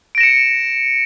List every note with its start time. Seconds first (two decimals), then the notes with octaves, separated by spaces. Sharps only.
0.15 D7
0.18 A#6
0.21 E7
0.23 C#7